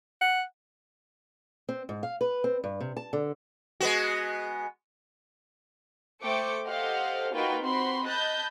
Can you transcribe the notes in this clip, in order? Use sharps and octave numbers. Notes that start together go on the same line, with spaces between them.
F#5
C4
G#2
F5
B4
C4
G2
C3
A5
D3
G#3 B3 F#4
A3 C5 G5 D6 C#7
G4 A4 C5 D#5 F5 F#5
A#3 D#4 F4 F#4 B4 G5
C4 F#4 B5 C6
D#5 A5 B5 F#6 G6